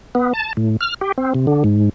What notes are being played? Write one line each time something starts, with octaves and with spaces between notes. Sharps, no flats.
B3
A5
A2
F6
G4
C4
C3
D3
G#2